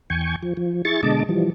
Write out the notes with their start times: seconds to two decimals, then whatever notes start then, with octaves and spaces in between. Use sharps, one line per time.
0.10 E2 G5 G#5 C#6
0.43 F3
0.57 F3
0.85 E4 G#4 C#6 A6
1.03 B2 D3 G#3 D#5 A5 D6
1.29 E3 F3 G3